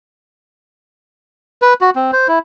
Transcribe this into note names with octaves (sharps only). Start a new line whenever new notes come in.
B4
F#4
C4
C5
E4